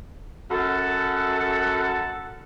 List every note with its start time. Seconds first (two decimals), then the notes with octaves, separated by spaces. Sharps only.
0.51 F#2 A4 F#5